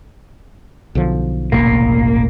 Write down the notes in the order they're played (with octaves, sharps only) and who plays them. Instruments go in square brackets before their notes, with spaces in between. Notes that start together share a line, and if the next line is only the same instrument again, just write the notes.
[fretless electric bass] B1 D3 F3
[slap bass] E1 A1 A#2 [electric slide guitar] A#3